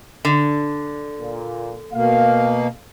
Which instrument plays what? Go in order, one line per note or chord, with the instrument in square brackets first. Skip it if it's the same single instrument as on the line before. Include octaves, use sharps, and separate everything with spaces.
[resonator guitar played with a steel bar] D3
[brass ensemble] A#2
[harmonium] B2 A#3 [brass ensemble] F5